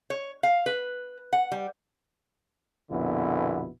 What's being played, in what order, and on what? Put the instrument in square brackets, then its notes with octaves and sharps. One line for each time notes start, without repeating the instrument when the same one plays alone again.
[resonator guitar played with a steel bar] C#5
F5
B4
F#5
G3
[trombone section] A#1 F2 B2 D3 B3 E4